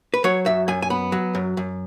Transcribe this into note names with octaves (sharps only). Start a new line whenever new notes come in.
B4
F#3 C#5
F#2 E5
F#2 G#5
G#5
B3 B5
F#3
F#2
F#2